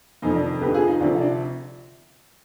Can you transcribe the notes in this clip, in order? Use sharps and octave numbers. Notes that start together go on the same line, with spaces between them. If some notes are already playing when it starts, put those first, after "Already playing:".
F1 F2 D#3 D#4
D4
D2 D3 F3 G4 B4
F4 G#4
D#4
D2 C3 F3 D4 F4
D4